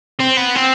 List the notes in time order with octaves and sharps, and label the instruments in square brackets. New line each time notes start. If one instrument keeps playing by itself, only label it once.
[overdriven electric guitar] C4
B3
C4